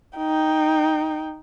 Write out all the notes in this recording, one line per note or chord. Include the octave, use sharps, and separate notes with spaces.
D#4 G5